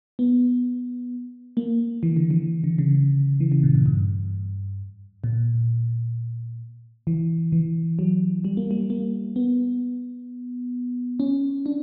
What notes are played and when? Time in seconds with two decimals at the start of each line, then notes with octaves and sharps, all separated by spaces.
0.19 B3
1.57 A#3
2.03 E3
2.17 D3
2.30 E3
2.64 D3
2.78 C#3
2.94 C#3
3.40 E3
3.52 C#3
3.63 A#2
3.74 G2
3.86 G2
5.24 A#2
7.07 E3
7.52 E3
7.99 F#3
8.44 G3
8.57 A#3
8.71 G3
8.90 A#3
9.36 B3
11.20 C#4
11.66 D4